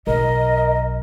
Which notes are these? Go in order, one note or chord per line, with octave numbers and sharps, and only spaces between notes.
B1 A#4 D#5